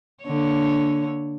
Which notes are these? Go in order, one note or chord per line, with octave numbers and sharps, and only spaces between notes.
D3 A#3 C#5